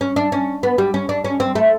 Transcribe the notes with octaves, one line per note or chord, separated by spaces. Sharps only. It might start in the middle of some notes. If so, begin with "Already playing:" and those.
C#4
D4
C#4
B3
G3
C#4
D4
C#4
C4
A3